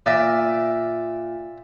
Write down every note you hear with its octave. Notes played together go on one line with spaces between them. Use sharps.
A#2 D5 E5